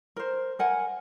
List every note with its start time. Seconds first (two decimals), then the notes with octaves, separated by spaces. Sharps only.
0.16 A#4 C5
0.59 A#4 F#5 G#5